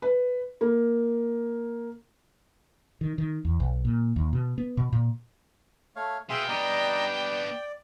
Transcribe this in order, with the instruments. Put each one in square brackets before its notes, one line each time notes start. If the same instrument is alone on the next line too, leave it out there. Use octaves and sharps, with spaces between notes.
[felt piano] B4
A#3
[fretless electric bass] D#3
D#3
E2
B1
A#2
D#2
B2
B3
B2
A#2
[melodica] A3 C#5 F5
[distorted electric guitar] B2 [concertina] G#4 E5 C6 [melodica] F5 [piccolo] G5
[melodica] G3 [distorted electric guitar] B3 D4 [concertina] D5 D#5 A#5
[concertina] D5